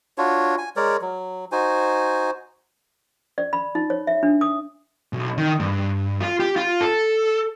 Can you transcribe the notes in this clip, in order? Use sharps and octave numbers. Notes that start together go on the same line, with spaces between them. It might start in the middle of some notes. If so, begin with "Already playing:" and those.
D4 F4 F#4 C#5
G#5
G#3 A#4 C#5 D5
F#3
D#4 F#4 C5 G#5
D5
B5
D#4
C#5
E5
D4
D#6
B1
D#3
G2
F4
G4
F4
A4